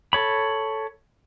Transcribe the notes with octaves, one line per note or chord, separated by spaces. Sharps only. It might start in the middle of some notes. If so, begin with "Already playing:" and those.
A4 C#5 B5